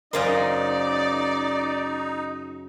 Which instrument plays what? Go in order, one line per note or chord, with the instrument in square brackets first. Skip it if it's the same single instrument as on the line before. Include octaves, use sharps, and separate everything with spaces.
[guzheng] F#2 C#3 C5 [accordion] D#4 [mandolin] A#4 D#5 F5 [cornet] D5